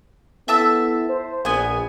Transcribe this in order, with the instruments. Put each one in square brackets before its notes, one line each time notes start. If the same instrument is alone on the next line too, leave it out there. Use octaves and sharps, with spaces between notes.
[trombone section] B3 E4 A4 [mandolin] E5 A5 E6
[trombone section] C5
[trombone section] A#1 [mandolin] B3 G#5